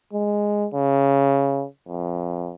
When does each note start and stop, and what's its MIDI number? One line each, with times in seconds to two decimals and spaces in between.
0.13 0.67 56
0.74 1.65 49
1.88 2.55 41